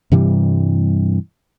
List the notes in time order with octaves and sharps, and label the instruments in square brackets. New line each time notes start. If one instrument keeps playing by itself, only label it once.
[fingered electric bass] G2 C3 E3 G3